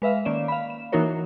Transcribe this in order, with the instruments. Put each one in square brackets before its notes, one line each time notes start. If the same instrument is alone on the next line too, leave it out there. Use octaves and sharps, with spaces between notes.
[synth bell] G#3 B4 E5 F5
D#3 A#3 C#4 D5 E7
F5 B5
E7
E3 A#3 D#4 F#4 A#4 C#5